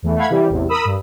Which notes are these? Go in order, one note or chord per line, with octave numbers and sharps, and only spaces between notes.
E2 E3 A3
A3 F5 F#5 B5 G#6
C3 E3 G3
A1 E2 C3
A#4 B5 D#6 E6
G2